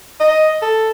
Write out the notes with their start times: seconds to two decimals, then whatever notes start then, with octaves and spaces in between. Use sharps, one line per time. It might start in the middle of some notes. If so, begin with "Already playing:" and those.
0.20 D#5
0.62 A4